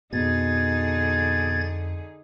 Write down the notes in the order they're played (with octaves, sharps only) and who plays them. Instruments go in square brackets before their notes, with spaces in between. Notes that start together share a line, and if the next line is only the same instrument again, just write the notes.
[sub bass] F2 [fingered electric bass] B2 [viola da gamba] D3 D#4 G#4 [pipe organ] G#6 A6